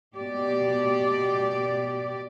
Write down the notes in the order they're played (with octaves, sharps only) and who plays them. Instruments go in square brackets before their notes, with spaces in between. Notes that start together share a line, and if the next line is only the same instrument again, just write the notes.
[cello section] B2 G4 D5